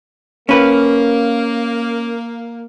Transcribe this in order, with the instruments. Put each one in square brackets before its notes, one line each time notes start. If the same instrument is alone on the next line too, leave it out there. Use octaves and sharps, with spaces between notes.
[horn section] A#3 [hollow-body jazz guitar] C#4 B4